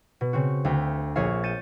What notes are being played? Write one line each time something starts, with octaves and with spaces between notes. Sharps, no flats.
B2
C#3 C4 F#4
D2 E5 F5 G5
A#1 G#4 C#5 E5 F5
G6 A6 C#7 D#7 E7